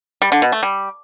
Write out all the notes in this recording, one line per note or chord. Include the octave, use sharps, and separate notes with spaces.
G3
D3
B2
A3
G3